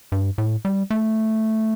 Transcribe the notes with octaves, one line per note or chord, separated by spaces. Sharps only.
G2
A2
G3
A3